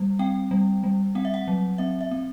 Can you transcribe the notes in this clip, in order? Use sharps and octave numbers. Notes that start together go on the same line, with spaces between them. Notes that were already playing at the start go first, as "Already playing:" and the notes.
Already playing: G3
C4 G5
G3
G3
C4 F#5
E5
F#5
F#3
C4 E5
E5
C4